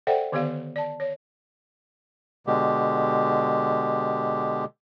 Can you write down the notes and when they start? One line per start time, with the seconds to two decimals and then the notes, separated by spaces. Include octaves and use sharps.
0.07 A4 C5 D5 E5 F#5 G5
0.32 D3 D#3 B3 G4 D5 F5
0.76 D5 A5
1.00 C#5
2.47 B2 D3 G#3 G4